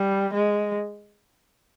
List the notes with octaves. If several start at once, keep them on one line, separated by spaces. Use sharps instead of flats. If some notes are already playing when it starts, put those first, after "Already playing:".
Already playing: G3
G#3